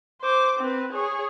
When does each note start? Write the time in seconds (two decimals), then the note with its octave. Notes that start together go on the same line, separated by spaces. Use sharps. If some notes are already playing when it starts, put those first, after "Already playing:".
0.22 C5 D6
0.59 C4 B4
0.92 G#4 C#5